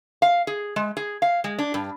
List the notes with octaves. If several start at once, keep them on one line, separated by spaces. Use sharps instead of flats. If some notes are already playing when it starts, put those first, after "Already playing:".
F5
G#4
G#3
G#4
F5
G#3
D4
G2